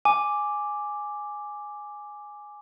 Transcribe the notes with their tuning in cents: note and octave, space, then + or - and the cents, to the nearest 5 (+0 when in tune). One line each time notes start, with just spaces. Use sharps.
G#5 +0 D6 +0